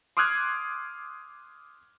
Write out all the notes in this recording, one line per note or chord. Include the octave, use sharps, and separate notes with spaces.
C6 D6 D#6 F6 F#6 G#6